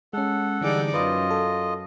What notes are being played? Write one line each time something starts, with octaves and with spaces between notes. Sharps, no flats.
G#3 C#4 A4 F#5
D3 E3 G3 D#4 G#4 D5
F#2 F4 B4 D#5
A4